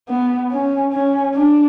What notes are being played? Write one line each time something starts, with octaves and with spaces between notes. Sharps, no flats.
B3
C#4
C#4
D4